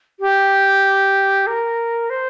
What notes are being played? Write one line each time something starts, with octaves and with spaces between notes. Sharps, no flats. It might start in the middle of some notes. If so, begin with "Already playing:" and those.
G4
A#4
C5